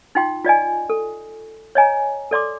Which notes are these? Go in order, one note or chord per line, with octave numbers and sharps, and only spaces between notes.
D#4 F4 G5 C6
F4 D5 D#5 G#5
A4
C#5 D#5 G#5 A#5
A4 D5 C6 D6